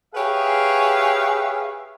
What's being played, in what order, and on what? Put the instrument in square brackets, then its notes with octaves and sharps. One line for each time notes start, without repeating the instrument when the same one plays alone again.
[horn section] G4 G#4 B4 C#5 E5 F5